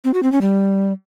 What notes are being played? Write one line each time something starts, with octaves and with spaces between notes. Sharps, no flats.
C4
F#4
C4
C#4
G3